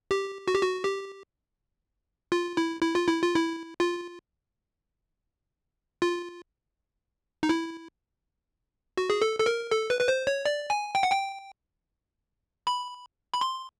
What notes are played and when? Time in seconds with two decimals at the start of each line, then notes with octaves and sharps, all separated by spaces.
0.11 G4
0.48 F#4
0.55 G4
0.62 F#4
0.84 G4
2.32 F4
2.57 E4
2.81 E4
2.95 F4
3.08 E4
3.22 F4
3.35 E4
3.80 F4
6.02 F4
7.43 D#4
7.49 E4
8.97 F#4
9.10 G#4
9.22 A4
9.40 A4
9.46 A#4
9.71 A4
9.90 B4
10.01 B4
10.08 C5
10.27 C#5
10.46 D5
10.70 G#5
10.95 G5
11.03 F#5
11.12 G5
12.67 B5
13.34 B5
13.41 C6